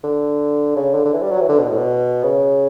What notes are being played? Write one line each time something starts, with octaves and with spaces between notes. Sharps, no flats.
D3
C#3
D3
D3
E3
G3
F#3
E3
D3
B2
A2
B2
C#3